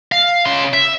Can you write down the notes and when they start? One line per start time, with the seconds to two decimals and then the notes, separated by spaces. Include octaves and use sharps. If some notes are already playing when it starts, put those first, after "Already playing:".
0.12 F5
0.46 C#3 C6
0.74 E5